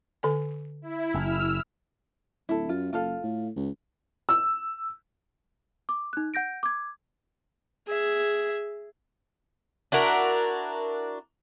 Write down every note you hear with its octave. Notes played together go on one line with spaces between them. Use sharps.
D3 A4 G#5
E4
F#1 E6 F6
D1 E4 A4
F#2 F4
F#1 F4 A4 F5
A2
C#2
E6
D6
D#4 F#6
F#5 G6 A#6 D7
D6 G#6
G#4 E5
D4 E4 F#4 A#4